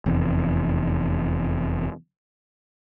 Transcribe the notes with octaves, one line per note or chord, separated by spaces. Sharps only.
F1 E2